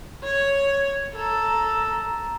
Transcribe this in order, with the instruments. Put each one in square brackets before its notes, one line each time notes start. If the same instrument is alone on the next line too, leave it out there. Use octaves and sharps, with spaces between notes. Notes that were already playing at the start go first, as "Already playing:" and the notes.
[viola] C#5
[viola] A4 [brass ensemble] A#5